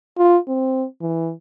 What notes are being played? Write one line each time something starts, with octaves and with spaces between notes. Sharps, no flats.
F4
C4
E3